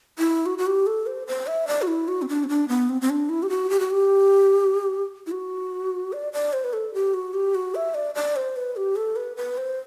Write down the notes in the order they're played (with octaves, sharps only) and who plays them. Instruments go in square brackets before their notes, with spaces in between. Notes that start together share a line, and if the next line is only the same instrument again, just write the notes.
[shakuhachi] E4
F#4
F#4
G4
A4
C5
C5
E5
D5
F#4
E4
F#4
C4
D4
C4
D4
B3
C4
C4
D4
E4
G4
F#4
G4
F#4
G4
E4
F#4
D5
D5
C5
B4
A4
G4
F#4
G4
F#4
E5
D5
D5
C5
B4
G4
A4
B4
B4
C5